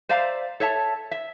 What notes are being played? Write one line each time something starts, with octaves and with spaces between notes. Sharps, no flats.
C5 D5 E5 F5 A#5
A4 C#5 E5 A5
E5